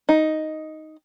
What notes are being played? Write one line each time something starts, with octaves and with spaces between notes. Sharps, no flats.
D#4